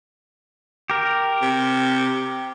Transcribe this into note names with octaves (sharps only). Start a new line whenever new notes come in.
G4 A#4
C3